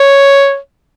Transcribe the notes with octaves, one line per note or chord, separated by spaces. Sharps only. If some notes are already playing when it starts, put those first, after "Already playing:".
Already playing: C#5